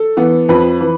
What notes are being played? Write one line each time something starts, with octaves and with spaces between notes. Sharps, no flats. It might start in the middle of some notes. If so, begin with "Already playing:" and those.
Already playing: A4
E3 B3
F2 B4
E3